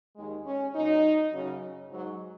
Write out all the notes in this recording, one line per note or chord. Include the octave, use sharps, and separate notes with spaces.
D#2 D#3 G#3
C#4
A#2 F#3 D#4
F#2 C#3 F#3
G#2 F#3